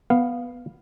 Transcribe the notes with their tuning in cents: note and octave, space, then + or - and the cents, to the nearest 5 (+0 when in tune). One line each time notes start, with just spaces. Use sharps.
B3 +0 F5 +0